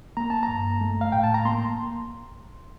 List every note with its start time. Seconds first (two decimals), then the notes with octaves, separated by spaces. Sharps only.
0.17 A#3 A#5
0.30 A5
0.43 A#5
0.48 G2
0.81 A3
1.01 F5
1.12 A2 G5
1.23 A5
1.34 A#5
1.45 A#3 C6